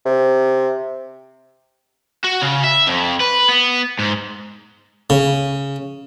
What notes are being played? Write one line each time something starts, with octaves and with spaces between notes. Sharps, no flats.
C3
F#4
C#3
E5
F2
B4
B3
G#2
C#3